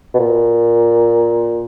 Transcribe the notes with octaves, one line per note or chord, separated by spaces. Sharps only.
B2
A#2